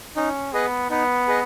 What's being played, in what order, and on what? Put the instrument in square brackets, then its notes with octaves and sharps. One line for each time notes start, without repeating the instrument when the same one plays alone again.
[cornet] C#4 [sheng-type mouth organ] D#4
[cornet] B3 [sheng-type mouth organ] G#4 B4 D#5
[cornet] B3 [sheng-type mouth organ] D#4
[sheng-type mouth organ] G#4 B4 D#5